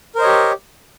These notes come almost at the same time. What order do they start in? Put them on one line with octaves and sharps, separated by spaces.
A#4 C5 D#5 C#5 G4